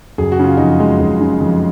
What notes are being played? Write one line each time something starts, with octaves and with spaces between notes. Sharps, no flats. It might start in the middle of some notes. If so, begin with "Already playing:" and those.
F#1 G#4
F#4
C#3 F4
F2 D#4 F#4
G#3
F#1
C#3
F2